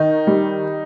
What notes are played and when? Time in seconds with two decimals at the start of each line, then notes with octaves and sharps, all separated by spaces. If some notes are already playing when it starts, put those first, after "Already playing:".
Already playing: D#3 D#4
0.27 G3